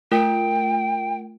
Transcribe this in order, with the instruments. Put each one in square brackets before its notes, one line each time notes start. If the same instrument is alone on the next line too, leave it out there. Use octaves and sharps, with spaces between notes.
[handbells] A3 F4 A#4 [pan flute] G5